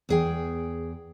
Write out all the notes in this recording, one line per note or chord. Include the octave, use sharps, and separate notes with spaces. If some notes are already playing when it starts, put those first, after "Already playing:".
E2 G#4 G5